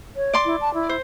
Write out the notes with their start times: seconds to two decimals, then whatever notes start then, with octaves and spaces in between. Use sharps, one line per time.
0.16 C#5
0.34 D5 C6 D6
0.45 E4
0.61 A5
0.74 E4
0.89 C5